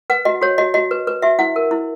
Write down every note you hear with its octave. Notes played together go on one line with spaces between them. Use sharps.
B4 F#5
F#4 D#5
F#4 C#5
F#4 D#5
F#4 D#5
B4
B4
F#4 E5
E4 F#5
A#4
E4